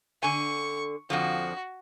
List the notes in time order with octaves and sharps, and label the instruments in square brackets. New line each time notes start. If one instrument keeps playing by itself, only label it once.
[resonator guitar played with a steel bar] D3 G#5 [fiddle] C#6
[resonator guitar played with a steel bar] F2 D3 F3 [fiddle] F#4